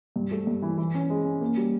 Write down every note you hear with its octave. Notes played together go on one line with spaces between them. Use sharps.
G2
A3
G2
E3
E3
C#4
G#3
C#4
A#3
G3